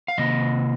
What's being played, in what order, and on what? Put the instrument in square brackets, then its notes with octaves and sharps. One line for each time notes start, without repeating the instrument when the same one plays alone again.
[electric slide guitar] F5
C3 D#3 A#3 D#5